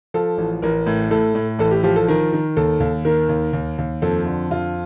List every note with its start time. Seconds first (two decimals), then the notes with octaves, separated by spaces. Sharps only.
0.14 F3 A4
0.38 A1
0.62 A1 A#4
0.86 A2
1.10 A2 A4
1.35 A2
1.59 A1 A4
1.71 G4
1.83 F3 G4
1.96 A4
2.08 D#3 A#4
2.33 D#3
2.57 D#2 A4
2.80 D#2
3.05 D#3 A#4
3.29 D#2
3.53 D#2
3.78 D#2
4.02 F2 A4
4.26 D3
4.50 F2 F4